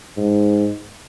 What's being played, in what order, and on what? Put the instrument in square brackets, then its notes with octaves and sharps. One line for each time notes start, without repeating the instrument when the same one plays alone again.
[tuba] G#2